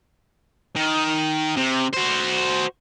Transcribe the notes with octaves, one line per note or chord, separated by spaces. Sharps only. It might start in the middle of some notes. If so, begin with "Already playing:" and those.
D#3
C3
F#4 C5